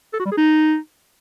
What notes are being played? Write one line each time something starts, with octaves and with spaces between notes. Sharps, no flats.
A4
F#4
G3
G#4
D#4